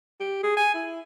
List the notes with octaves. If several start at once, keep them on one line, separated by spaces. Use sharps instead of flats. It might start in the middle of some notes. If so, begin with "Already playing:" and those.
G4
G#4
G#5
E4